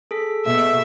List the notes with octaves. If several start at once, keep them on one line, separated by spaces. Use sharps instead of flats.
G#4 A4 B6
B2 E5